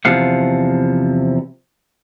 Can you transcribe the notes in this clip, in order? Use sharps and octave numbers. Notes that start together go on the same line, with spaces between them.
E2 C3 F3 F5 F#5